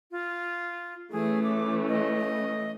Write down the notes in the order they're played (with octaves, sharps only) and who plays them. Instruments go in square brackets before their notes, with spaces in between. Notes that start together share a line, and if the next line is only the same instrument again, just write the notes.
[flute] F4
[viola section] E3 A3 C#4 [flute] G#4
[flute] D6
D#5